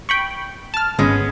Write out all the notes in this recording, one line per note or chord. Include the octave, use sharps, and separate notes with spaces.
G5 B5 C#6
A5 F6
G#1 G#3 B3 C#4